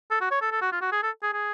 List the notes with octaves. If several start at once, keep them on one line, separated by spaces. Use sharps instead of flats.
A4
F#4
C#5
A4
A4
F#4
F4
F#4
G#4
A4
G#4
G#4